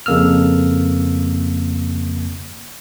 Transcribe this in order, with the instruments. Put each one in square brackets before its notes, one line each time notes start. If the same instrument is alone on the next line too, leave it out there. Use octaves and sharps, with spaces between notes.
[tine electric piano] F2 C#3 A#3 E6 F6